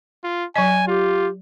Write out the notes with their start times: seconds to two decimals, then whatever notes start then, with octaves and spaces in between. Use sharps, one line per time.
0.24 F4
0.56 F#3 D#5 G#5
0.88 F4 G4